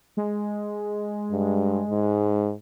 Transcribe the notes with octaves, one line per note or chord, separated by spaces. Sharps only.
G#3
G2
G#2